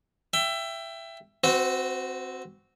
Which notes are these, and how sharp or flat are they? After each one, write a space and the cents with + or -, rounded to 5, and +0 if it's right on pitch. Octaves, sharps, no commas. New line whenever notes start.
E5 +20 G5 +0
C4 +0 F#4 +0 B4 +45